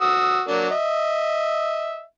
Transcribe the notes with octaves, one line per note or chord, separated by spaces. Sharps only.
F#4 D#6 E6
F#3 A#3 D4
D#5 E5